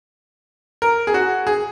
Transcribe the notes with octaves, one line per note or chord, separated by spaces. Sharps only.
A#4
G#4
F#4
G#4